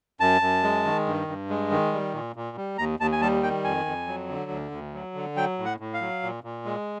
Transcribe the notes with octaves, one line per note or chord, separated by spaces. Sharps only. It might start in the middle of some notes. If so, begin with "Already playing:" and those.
F#2 A5
F#2
G#3
D#3
G2
G2
G#3
D#3
G3
A#2
A#2
G3
D#2 A#5
D#2 A5
G#5
G3 A5
D#3 G5
F2 G#5
F2
F#3
D3
D2
D2
F#3
D3
F#3 G5
A2
F#5
A2
F5
F#3
A#2
A#2
G#3